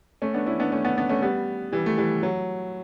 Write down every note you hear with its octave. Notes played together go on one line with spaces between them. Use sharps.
A3 C#4
B3 D4
C#4 E4
B3 D4
A3 C#4
B3 D4
B3 D4
A3 C#4
G3 B3
E3 G3
A3
E3 G3
F#3